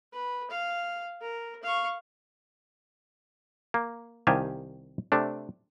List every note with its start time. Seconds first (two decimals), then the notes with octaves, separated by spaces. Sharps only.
0.13 B4
0.50 F5
1.21 A#4
1.63 F5 C#6
3.74 A#3
4.27 C2 D#3 G4 F5 G#5 A5
5.12 C3 A3 D4